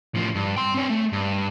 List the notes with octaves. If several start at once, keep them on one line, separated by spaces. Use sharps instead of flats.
A2 F3
G2
G5 C6
C4 C#5
A3
G2